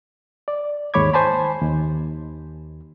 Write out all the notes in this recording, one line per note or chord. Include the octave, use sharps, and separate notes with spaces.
D5
D#2 G#2 C#5 B5 D6 G#6
C5 G#5 A5 B5
D#2